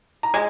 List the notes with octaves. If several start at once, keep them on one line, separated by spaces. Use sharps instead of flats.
A#5
G#3 G#5